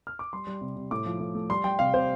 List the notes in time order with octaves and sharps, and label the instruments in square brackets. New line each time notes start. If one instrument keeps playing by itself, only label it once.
[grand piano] F6
D6
G3 C6
G3
C3
C3
A2 D6
F3
A2
A3
G3 C6
G3 G5
C3 F5
C3 C5